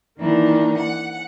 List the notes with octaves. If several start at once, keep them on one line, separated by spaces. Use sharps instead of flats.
D#3 E3 A#3 D4 D#4
F#5